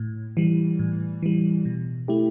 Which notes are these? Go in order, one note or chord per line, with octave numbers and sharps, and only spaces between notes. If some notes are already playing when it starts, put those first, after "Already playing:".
Already playing: A2
E3 G3
A2
E3 G3
B2
A3 E4 G4